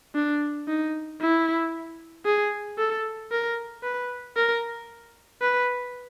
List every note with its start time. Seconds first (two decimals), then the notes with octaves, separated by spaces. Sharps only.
0.15 D4
0.68 D#4
1.21 E4
2.26 G#4
2.78 A4
3.32 A#4
3.83 B4
4.36 A#4
5.42 B4